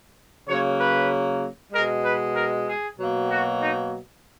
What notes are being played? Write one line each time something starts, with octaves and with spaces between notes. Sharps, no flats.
C#3 F#3 A#3 C#5
B4
B2 G#3 A#4
B4
A#4
G#4
B2 F#3 A#3
F#4
D#4